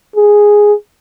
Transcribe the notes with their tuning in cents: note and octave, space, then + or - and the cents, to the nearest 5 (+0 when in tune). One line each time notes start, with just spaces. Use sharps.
G#4 +0